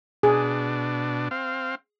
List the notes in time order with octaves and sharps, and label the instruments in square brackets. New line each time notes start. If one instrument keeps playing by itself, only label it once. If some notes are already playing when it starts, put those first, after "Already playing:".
[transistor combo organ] B2 D4 [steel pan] G#4
[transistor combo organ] C4 F5